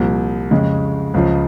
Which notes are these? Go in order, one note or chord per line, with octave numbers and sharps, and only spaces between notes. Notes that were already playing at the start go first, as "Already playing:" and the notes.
Already playing: C2 A#2 F3
F2 C#3 G#3
C#2 C#3 F3